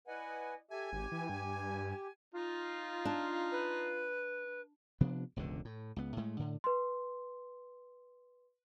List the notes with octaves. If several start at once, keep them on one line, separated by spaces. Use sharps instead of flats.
E4 B4 D5 D#5 F#5 G#5
G4 A4 E5 G#5
G#1 G4
E3
G2
D#4 F4
D4
B4
C3 F3 B3 D4
E1 C#2 G2 D3
A2
C#2 B3
A2 G#3 A3
A2 D3
B4 C6